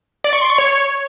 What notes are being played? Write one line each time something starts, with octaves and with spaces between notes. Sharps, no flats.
D5
C#6
C6
C#6
C#5